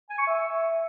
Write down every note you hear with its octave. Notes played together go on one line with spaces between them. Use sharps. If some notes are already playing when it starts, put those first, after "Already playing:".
G#5
C#6
E5